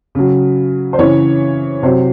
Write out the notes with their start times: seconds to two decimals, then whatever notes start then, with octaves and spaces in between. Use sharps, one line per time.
0.15 C#3 F#3
0.93 C5
0.99 C#3 E3 C#5
1.83 C3 F#3 C5